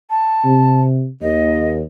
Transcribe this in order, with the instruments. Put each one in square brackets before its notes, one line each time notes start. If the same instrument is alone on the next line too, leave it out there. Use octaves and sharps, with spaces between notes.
[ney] A5
[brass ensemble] C3
[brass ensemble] D#2 [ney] D#5